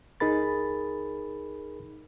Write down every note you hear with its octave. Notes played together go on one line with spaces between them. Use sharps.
C#2 D#4 G#4 A#4 B5 A6